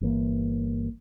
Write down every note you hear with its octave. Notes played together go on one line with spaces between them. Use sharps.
G1 E3 A#3